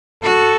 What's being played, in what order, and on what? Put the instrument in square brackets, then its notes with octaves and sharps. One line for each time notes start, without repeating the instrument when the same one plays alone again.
[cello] F#4 [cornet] A4